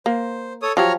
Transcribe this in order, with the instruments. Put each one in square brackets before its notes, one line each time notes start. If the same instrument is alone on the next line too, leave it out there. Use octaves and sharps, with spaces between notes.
[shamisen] A#3 [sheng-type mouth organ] C5
[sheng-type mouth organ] A4 C#5 D#6
[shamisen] F3 F#3 G4 [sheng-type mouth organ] C#5 A#5 F6